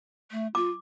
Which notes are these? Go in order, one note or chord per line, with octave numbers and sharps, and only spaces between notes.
A3
F4 D6